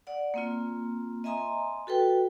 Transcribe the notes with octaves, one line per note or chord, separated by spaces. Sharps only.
D5 F#5
A#3 C4 F4
D#5 E5 G#5 A#5 C6 D#6
F#4 A4 B4 G5